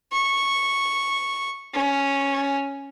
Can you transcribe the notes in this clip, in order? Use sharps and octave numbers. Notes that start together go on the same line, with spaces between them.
C#6
C#4